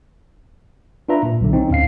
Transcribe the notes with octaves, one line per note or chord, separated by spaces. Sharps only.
D4 F4 B4 E5 A#5
A#2
B1 D3
C4 C#4 D#4
D2 A2 F5 C7